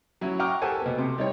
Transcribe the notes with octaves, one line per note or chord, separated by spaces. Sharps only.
F#3 C#4 E4
F#5 G5 A#5 C#6 D6 F6
G4 A4 C5 F#5 G#5
B2 B3
C3
G3 D#4 C#5